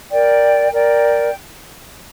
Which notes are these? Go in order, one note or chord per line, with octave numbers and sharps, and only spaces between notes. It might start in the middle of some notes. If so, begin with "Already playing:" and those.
A#4 D5 G5
A#4 D5 G5